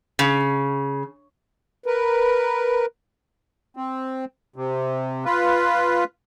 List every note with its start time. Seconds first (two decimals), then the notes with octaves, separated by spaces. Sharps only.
0.19 C#3
1.86 A#4 B4
3.77 C4
4.56 C3
5.25 F4 B4